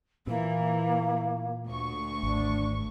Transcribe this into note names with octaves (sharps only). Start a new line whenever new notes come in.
A#2 E3 A#3
D2 C#6
G#1 D4